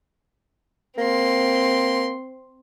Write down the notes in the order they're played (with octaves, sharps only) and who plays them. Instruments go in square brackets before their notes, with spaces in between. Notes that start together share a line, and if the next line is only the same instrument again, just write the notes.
[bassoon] A#3 [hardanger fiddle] C4 C6